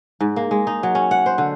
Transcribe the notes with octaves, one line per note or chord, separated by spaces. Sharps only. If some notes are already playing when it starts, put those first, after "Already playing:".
G#2
A#3
G#3
D#4
F#3
C#4
F#5
C5
D3